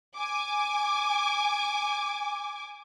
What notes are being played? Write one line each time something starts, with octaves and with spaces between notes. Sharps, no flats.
G#5 D6